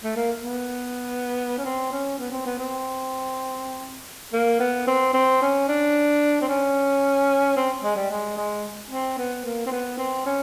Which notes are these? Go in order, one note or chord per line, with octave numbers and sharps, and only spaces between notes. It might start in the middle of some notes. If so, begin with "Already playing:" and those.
A3
A#3
B3
C#4
C4
C#4
B3
C4
B3
C4
A#3
B3
C4
C4
C#4
D4
C4
C#4
C4
G#3
G3
G#3
G#3
C4
B3
A#3
C4
B3
C4
C#4